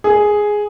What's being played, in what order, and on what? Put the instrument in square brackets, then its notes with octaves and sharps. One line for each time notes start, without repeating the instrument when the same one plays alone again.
[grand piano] G#4